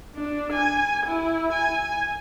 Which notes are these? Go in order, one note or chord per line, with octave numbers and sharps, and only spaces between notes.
D4
G#5
E4
G#5